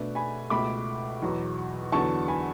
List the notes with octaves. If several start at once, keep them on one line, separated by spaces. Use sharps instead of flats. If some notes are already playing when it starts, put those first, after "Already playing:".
Already playing: B2 A3 D4 B4 D5
G#5 B5
C#2 B2 A3 B5 D6
E2 B2 F#3
E2 D3 F#3 B3 A5 C#6
G#5 B5